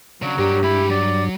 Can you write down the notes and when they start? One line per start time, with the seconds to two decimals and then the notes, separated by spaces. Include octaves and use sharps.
0.22 C#3 F#3 D4
0.39 G2 G4 A#4 D5
0.63 G#3 E4 B5
0.90 F#3 D5